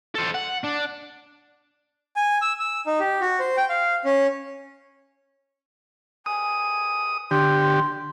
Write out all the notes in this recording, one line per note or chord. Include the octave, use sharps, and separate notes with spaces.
A4 C5
F#5
D4
G#5
E6
E6
D#4
G4
F#4
C5
G5
F5
C#4
G#5 D#6
D3 G4 C6